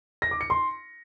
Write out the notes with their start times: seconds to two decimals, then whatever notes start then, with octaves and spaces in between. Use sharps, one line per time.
0.22 A#6
0.31 D6
0.41 C#7
0.50 C6